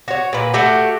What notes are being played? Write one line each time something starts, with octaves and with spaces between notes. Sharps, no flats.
F#4 C#5
A#2 B4
A3 F#4 G4